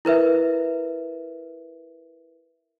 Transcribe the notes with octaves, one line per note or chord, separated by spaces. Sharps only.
E4 A#4 B4 E5